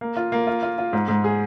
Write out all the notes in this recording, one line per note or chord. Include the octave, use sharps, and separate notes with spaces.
A#3
F4
A#3
F4
F4
F4
G#2
G#2
G#4